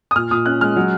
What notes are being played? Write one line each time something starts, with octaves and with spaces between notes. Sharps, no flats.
D#6
A#2 F6
A#2 D#6
C#4 F#6
G#3 F6
F#3